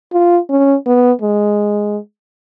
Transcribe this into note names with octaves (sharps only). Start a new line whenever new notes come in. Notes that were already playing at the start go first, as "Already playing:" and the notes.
F4
C#4
B3
G#3